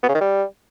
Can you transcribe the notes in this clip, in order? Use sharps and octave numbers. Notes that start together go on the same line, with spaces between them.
B3
C#3
D#3
G3